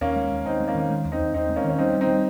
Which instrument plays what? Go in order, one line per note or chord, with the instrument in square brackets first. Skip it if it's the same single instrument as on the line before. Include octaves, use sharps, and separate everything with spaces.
[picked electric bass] D#2 [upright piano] A#3 C#4
[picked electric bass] G#3
D#2
[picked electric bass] D#2 [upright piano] C4 D#4
[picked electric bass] G#3
[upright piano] A#3 C#4
[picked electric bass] D#3
G#3
D#2
[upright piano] C4 D#4
[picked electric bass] D#2
[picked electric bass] D#2 [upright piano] C4 D#4
[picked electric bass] G#3
[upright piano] A#3 C#4
[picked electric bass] D#3
[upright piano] C#4
[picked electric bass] G3 [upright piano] C4 D#4
[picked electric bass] G3
[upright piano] C4 D#4
[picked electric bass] G3